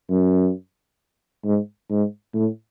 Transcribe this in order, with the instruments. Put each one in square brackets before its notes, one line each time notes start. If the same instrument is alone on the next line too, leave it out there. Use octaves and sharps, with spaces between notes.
[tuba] F#2
G#2
G#2
A2